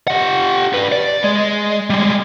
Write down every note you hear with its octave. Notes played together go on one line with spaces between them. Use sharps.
G4 F#5
G4 B4
D5
G#3
G3 G#3